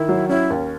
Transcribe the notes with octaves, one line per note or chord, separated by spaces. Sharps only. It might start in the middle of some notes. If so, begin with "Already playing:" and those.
Already playing: D#3 E4
F#3
C#4 E4
D#2